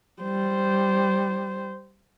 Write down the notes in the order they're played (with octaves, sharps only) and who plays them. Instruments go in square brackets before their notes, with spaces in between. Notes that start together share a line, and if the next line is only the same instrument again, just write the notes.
[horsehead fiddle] G3 C5